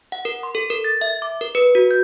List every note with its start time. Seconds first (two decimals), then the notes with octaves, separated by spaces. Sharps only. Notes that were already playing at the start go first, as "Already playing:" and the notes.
0.12 F#5
0.25 A#4
0.43 C6
0.55 A4
0.70 A#4
0.84 A6
1.01 E5
1.22 D6
1.41 A#4
1.55 B4
1.75 F#4
1.91 G6